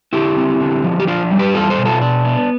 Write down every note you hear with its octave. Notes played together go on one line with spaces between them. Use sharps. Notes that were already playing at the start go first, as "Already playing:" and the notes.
D3 E4 G4
C4
D3
F3
G4
D4 F4
G3
G4 B4
E2 F4 A4
A4 C5
B2
F4 A4
D4
B3